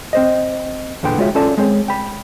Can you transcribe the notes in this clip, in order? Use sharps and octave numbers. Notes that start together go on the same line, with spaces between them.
C4 C5 D#5
E2 A#2 D3 B3 G5 C6
G#3 F4 F#4 C#5 D#5 E5
C#4 F4 A4 D5 A5
G#3 C4 C#5
G5 B5